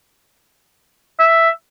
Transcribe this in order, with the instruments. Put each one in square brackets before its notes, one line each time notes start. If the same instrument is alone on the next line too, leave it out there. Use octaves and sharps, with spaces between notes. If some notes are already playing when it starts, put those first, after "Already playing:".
[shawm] E5